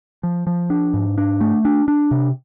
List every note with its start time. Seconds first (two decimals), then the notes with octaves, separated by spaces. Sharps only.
0.23 F3
0.47 F3
0.70 D4
0.94 G#2
1.18 D4
1.41 A3
1.65 D4
1.88 D4
2.11 C3